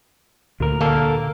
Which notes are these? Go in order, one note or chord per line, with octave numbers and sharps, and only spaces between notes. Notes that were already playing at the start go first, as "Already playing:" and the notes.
D2 A#2 A#4
D3 A#3 A4